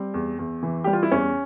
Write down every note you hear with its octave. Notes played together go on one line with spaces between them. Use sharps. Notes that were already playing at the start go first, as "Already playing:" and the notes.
Already playing: G3 C4
E2
E2
E3
G3 G4
F4
E4
E2 C#4